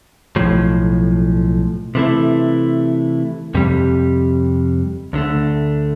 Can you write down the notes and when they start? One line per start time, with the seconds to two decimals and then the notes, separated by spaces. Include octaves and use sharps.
0.36 B1 A2 F3
1.95 C3 E3 A3 E4
3.55 F2 C3 G3
5.13 D2 D3 A3